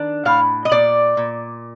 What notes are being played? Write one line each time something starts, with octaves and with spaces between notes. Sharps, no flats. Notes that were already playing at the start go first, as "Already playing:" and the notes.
Already playing: D#3 D4
A2 F5
D#5
A#2 D5
A#2